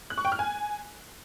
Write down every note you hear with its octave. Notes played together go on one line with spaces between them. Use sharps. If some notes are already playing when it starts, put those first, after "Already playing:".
F#6
C#6
G5
F6
G#5